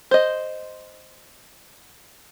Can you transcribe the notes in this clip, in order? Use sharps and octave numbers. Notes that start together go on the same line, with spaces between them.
C5 D#5